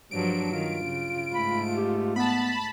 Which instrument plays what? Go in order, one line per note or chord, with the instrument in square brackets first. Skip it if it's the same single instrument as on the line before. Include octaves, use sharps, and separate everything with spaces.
[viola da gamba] G2 F3 F#3 [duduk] D4 [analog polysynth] D7
[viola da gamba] D#3 [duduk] F4
[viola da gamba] C#3
[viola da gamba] G#2 A3 [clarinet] B5
[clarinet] G4
[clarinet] B3 [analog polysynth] A5 B5